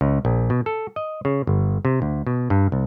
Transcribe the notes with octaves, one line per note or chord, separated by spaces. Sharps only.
C#2
A#1
B2
A4
D#5
C#3
G1
C3
D2
B2
G2
C2